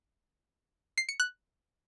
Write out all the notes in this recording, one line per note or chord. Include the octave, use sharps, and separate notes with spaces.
C7
C#7
F#6